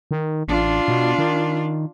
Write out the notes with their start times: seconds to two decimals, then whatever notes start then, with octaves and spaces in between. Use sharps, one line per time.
0.11 D#3
0.48 A1 D4 F4
0.88 B2
1.18 D#3